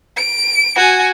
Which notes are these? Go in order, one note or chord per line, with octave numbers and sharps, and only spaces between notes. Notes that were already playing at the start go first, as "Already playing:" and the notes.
D7
F#4 G#5